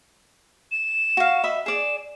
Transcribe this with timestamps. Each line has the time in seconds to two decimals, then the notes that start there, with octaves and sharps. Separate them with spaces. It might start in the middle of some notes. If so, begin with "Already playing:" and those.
0.72 E7
1.17 F#4 F5
1.44 D#5 E5 B5
1.66 G#4 D5 E7